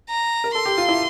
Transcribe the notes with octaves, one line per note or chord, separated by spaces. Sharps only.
A#5
A#4
A4 C6
G4
F4
E4